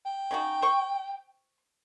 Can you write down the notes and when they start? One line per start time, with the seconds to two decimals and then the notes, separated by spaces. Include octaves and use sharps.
0.06 G5
0.31 C#3 D#4 F#4
0.62 C5 C#6